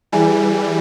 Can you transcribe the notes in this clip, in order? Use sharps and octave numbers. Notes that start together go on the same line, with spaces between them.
E3 G3 E4 G#4 E5 G#5